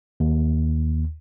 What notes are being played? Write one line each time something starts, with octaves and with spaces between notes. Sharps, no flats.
D#2